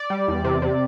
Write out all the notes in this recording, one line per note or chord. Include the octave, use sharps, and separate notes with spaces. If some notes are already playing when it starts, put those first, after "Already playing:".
Already playing: D5
G3
E2
C3
C3